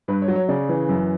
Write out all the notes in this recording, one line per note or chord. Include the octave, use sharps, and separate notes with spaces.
G2 B4
C#5
F#3
C#5
C#3 D5
E3
F#2